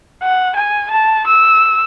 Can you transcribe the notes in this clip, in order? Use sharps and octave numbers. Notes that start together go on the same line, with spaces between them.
F#5
G#5
A5
E6